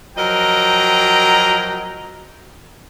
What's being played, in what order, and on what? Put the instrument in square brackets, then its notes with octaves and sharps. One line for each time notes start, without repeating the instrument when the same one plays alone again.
[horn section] F3 F#3 A#4 D#5 G5 A#5